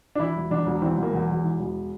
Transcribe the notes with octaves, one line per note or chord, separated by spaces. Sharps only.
D4
E3 E4
E1
E2 D4
E1
E3 C4
E1
A#3
E2
E1
E3
E1